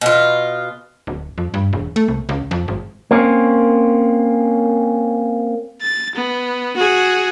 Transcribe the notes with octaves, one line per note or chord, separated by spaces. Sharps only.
B2 F4
D1
F2
G2
E1
A3
C2
C#2
F2
G#1
A#3 C4 C#4
A6
B3
F#4 G#4